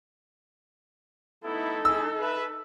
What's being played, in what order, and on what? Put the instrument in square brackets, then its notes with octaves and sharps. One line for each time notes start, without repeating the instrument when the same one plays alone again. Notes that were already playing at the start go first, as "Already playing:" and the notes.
[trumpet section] A3 B3 E4 [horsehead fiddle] D#4 A4
[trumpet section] A3 E4 G#4 [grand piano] E6
[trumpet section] B4 E5